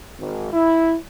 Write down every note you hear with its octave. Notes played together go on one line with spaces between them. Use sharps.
G#1
E4